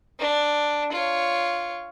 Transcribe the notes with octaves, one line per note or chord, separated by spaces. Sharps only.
D4
F4 C#5